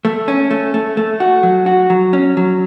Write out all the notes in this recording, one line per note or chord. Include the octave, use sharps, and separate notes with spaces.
A3
C#4
A3
A3
A3
F#4
F#3
F#4
F#3
C#4
F#3